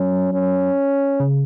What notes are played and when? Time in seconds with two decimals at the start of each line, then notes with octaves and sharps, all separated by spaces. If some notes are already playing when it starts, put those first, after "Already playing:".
Already playing: F#3 C#4
0.33 C#4
1.20 C#3